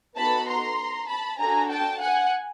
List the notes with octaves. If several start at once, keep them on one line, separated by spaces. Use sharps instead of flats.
B3 D#4 F#4 A4 A5 B5
A#5 C6
A5 B5
D4 F#4 A4 G#5 A#5
G5 A5
F#5 G#5